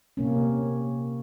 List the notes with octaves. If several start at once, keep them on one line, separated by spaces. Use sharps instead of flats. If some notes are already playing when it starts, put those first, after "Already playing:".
C3 A#3 C#4